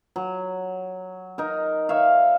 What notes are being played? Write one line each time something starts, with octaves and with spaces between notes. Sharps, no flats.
F#3
D#4 A#4
C#5 E5 F5